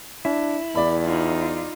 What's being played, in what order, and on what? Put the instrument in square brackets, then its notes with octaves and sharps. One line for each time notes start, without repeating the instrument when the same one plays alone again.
[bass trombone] D4 [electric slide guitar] E4
[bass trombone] E2 [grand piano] D5 B5
[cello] D#4 F4